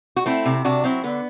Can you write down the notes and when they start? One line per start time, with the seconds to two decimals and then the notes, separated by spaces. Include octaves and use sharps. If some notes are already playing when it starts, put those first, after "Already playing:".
0.16 F#4
0.26 A3 C4 E4
0.45 C3
0.65 C3 D4 F#4
0.84 F#3 C4 E4
1.04 D3 B3